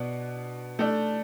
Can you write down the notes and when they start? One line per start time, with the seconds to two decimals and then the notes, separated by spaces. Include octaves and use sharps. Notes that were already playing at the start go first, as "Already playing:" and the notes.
Already playing: B2 B3 D4
0.79 A3 D4 A4